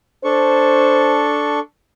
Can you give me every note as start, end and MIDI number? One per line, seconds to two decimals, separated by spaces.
0.24 1.59 62
0.24 1.59 69
0.24 1.28 72
0.24 1.59 85